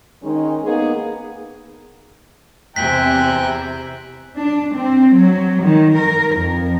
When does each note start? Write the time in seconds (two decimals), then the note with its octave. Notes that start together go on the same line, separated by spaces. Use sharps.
0.23 D#3 G#3 C#4 D#4
0.64 A#3 B3 D#4 G#4
2.76 E2 C3 E5 G5 G#5 A#5 F#6 B6
4.38 D4
4.76 C4
5.15 F#3
5.65 D#3
5.97 A#4
6.35 F2